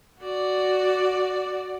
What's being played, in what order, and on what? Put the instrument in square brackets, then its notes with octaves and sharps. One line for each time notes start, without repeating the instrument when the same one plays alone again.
[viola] F#4 D5